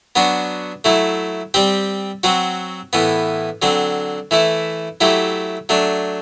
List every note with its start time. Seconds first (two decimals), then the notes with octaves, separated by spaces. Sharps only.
0.16 F#3 B3 D4 F#4
0.84 F#3 A3 E4
1.54 G3 C4 G4
2.23 F#3 C4 F#4
2.93 A2 E3 B3
3.62 D3 F#3 C4
4.31 E3 A3 E4
5.01 F#3 A3 E4 G4
5.69 F#3 A3 D4